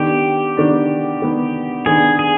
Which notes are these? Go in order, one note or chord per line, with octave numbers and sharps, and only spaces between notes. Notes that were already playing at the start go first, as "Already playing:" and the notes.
Already playing: D#3 B3 D4 G4
D#3 B3 D4
D#3 B3 D4
D#3 B3 D4 G#4
G#4